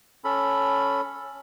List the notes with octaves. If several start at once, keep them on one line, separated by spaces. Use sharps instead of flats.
C#4 A4 B5